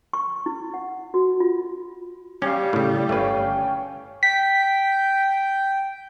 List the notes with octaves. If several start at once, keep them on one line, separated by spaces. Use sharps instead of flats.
C#6
E4
F#5
F#4
F4
G3 C#4 G4 C#5 F5
A2 C#3
G1 A3 C#4 B4 C#5 F5 G5
G5 B6